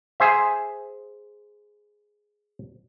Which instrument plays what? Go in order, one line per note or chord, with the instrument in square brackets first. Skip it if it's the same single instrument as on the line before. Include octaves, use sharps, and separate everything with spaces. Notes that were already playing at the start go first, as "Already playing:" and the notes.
[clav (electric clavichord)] G#4 C5 E5